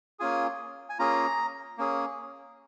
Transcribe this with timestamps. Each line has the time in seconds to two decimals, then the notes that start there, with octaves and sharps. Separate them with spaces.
0.20 A#3 C#4 F4 G#4 G#5
0.90 G#5
0.99 A#3 C#4 F4 G#4 A#5
1.78 A#3 C#4 G#4